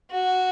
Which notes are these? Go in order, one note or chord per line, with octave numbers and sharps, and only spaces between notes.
F#4